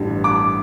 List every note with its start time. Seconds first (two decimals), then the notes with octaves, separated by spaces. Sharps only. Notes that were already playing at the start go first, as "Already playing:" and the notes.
Already playing: A1 G2 D3
0.24 D6